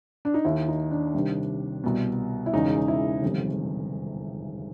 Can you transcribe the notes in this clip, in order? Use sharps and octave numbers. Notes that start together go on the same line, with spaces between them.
D4
D#4
D#2 D#3 E4
D#4
D4
C2 C3 D#3
C2 B2
E4
E1 E2 C#3 D#4
E4
G1 F2 C3 D#3